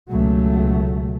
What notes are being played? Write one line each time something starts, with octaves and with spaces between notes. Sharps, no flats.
C#2 B2 F#3 A3